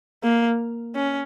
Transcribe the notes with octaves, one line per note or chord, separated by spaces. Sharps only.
A#3
C#4